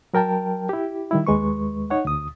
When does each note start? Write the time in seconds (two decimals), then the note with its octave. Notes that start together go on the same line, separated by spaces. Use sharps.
0.14 F#3 A#4 G5 A5
0.69 E4 G4
1.11 D#3 G3 E4
1.27 D#2 G#3 B4 C#6
1.90 D#4 C#5 F#5
2.05 D2 D#6